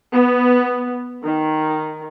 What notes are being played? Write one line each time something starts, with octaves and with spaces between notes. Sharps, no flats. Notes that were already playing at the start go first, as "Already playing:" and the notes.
B3
D#3